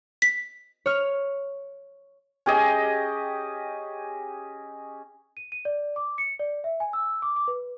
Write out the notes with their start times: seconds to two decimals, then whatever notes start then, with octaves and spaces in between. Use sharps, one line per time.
0.22 B6
0.86 C#5 F6
2.46 C#4 G4 G#4 D#5
5.37 D#7
5.52 D#7
5.65 D5
5.96 D6
6.18 C#7
6.39 D5
6.64 E5
6.80 G#5
6.93 E6
7.22 D6
7.36 D6
7.48 B4